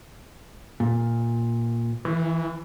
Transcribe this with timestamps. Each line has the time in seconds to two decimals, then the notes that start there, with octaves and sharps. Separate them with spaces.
0.80 A#2
2.05 E3